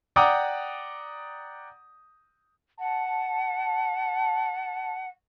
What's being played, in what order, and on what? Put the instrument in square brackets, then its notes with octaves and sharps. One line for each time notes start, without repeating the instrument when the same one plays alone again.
[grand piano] D5 F#5 G5 A#5 D6 D#6
[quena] F#5 [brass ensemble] A5